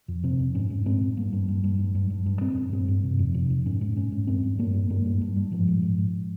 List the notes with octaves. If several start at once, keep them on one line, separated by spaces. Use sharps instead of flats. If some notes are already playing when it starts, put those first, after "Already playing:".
F2
C3 C4
F2
G#2 C#4
G#2
G#2 C4
G#2
G2 A#3
G2
G2
G2
G2
G2
G2
G2
G2 C4
G2
G2 C4
G2
C3
F2
C3
F2
G#2 C#4
G#2
G#2 C#4
G#2
G2 C4
G2
G2 A#3
G2
G2 A#3
G2
G2
G2
G#2 F3
G#2
G#2
G#2